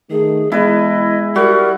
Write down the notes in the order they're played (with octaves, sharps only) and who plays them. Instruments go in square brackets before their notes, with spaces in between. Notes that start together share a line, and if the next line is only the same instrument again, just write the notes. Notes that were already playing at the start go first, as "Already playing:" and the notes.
[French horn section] D#3 A3 [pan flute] G#4
[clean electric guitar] E2 [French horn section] G#3 [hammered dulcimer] E4 B4 [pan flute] D#5
[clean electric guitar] G3 [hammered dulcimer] F#4 [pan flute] A#4